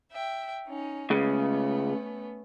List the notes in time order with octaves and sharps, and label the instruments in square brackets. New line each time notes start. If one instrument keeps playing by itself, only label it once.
[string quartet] E5 G5
C#4 D#4
[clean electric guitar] C#2 C#3 [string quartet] A3 B3 C#4